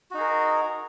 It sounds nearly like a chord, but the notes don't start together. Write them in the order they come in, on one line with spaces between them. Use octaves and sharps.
F#4 D#4 G#4 A#4